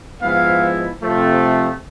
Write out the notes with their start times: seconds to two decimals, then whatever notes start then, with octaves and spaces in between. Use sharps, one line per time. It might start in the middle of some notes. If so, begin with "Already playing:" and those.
0.21 G#2 F3 G#3 B3 E4 F5
1.01 C3 F3 A3